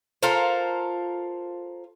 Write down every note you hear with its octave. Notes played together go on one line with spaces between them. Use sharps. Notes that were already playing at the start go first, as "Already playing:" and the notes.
F4 A4 A#4 C5